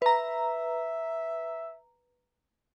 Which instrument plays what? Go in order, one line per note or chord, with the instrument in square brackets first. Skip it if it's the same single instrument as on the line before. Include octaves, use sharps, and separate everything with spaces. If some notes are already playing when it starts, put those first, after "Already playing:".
[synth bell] B4 A#5 [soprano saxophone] E5